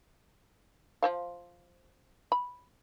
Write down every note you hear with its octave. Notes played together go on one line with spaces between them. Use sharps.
F3 C5 F5
B5